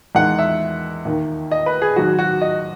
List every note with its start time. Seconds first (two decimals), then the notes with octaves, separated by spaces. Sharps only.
0.15 E2 D#3 G#3 F#5
0.39 E5
1.05 D#2 D#3 A#3
1.51 D#5
1.66 B4
1.82 G#4
1.96 G#1 G#2 F#3 F#4
2.19 F#4
2.41 D#5